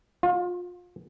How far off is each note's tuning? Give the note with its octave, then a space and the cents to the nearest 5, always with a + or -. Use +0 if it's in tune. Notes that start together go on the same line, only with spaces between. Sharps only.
F4 +30